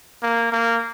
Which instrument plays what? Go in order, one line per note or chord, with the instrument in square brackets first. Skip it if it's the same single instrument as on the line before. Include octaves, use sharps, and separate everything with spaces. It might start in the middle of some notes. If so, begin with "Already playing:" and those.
[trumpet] A#3
A#3